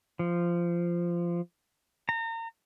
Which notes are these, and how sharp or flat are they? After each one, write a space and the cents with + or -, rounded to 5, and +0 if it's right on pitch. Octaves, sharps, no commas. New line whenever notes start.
F3 -15
A#5 -35